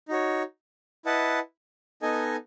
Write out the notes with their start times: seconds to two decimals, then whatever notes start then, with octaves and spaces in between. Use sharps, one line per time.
0.09 D#4 F#4 C#5
1.05 E4 B4 D#5 F#5 A5
2.02 B3 D#4 A4 D#5 G#5